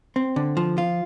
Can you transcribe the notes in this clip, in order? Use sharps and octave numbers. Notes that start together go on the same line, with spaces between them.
C4
D3
F3
F4